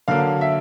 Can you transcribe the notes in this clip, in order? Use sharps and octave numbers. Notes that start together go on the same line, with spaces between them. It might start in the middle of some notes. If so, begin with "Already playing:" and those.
D3 F#3 A#3 F5
E5